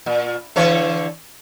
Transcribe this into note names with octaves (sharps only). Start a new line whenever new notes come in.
A#2
D3 E3 C#5